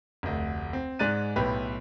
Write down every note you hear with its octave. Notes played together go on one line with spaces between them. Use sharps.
F1 D2
C4
G#2 G#3 D5 F#6 A6 D#7
B1 A2 G4 B4